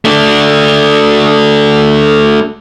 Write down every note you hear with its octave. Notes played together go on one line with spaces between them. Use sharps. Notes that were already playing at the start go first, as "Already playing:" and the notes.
A3 D4